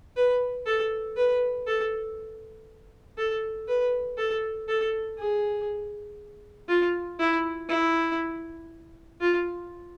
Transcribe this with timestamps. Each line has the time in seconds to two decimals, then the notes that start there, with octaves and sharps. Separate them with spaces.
0.16 B4
0.66 A4
1.17 B4
1.67 A4
3.18 A4
3.68 B4
4.18 A4
4.68 A4
5.18 G#4
6.69 F4
7.20 E4
7.69 E4
9.20 F4